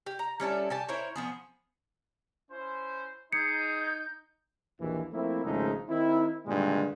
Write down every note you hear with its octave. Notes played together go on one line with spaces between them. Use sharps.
G4
A#5
G3 C#4 E4 A4
G4 G#5 A5
E4 A#4 C5 C#5
F3 B3 G#4
C#4 E4 C5
D#4 G#4 G6 C#7
A#1 D#2 E3
F3 A3 A#3 C4 E4
G#1 C#3 F3 G#3 A3 D#4
D#3 C4 D#4 E4
G2 A#2 D3 D#3 G#3